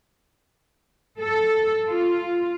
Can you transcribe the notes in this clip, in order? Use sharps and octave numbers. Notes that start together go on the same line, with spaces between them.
A4
F4